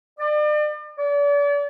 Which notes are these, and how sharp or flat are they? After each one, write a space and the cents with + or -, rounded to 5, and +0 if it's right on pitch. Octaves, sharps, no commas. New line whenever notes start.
D5 +40
D5 -40